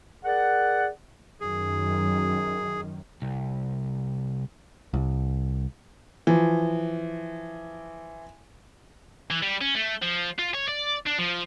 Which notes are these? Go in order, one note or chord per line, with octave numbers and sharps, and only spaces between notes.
G#4 A#4 D5 F#5
F#2 D#3 G#4
C2
C2
E3 F3
E3
G3
C#4
A3
F3
F4
C#5
D5
D4
F3